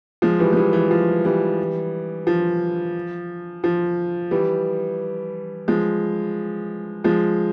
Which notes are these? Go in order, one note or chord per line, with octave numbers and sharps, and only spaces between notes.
F3 G#3
E3 G3
G#3
E3 G3
E3
F3
E3 G3
F3
F3
E3 G3
F3 G#3
F3 G#3